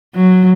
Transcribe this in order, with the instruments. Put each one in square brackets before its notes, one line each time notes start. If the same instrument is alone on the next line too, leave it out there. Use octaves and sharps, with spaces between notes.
[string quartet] F#3